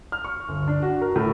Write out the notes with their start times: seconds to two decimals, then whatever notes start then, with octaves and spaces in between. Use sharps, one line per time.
0.12 F6
0.24 C#6
0.49 G1
0.68 D4
0.82 F#4
1.01 A#4
1.16 A2